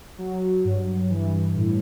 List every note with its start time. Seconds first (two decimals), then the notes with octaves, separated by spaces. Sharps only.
0.18 F#3
0.65 G2
1.10 E3
1.55 A2